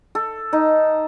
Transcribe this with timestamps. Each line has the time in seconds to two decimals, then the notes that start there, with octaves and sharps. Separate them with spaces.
0.15 A4
0.53 D#4